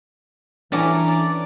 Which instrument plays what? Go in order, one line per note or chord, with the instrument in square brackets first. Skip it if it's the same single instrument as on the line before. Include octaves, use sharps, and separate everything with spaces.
[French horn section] E3 [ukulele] C#4 G#5 [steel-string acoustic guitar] D4 [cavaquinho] A4 A#5 D6
[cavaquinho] D5